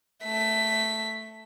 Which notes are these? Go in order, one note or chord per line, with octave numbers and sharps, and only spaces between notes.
A3 B6